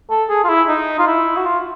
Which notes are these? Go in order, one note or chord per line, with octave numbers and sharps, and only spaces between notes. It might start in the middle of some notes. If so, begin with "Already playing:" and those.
A4
G#4
F4
E4
D#4
F4
E4
F#4
F4